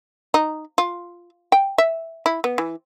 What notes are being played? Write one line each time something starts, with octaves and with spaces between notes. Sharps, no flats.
D#4
F4
G5
E5
E4
B3
E3